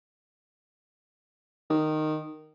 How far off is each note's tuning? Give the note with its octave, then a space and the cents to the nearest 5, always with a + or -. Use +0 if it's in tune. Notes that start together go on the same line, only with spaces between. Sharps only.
D#3 -10